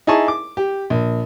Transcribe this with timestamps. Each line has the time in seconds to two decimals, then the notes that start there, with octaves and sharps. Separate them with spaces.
0.07 D#4 E4 G#4 G#5 A5 C#6
0.28 D6
0.57 G4
0.90 A#1